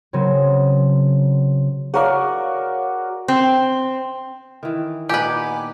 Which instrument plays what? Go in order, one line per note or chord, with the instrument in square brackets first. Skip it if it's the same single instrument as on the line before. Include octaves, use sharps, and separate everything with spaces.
[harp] C#3 F#3 C4 C#4
[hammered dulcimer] F#4 A#4 D5 [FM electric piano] G#4 C#5 F5
[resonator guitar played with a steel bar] C4
[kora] D#3 E3
[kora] A#2 B3 D#4 [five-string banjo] G4 B4 [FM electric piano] G#5 D6